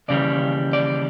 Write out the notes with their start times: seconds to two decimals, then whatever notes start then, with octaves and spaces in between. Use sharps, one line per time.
0.08 D#2 C#3 E3 G3 D5
0.73 D5